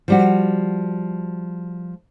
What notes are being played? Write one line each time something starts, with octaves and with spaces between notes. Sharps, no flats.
F3 G3 F#4